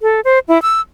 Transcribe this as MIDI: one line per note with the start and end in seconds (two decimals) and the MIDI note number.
0.01 0.20 69
0.25 0.39 72
0.48 0.61 64
0.62 0.81 88